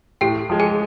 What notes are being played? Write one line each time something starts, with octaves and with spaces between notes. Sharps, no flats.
A2 G4 G5
F3 G#3
G#4 G#5